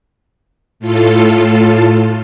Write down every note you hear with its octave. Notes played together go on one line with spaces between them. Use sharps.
A2 F4 A4